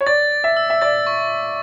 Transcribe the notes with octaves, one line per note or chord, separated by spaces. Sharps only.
C#5
D5 A6
A6
E5
E6
E5
D5 A6
C#6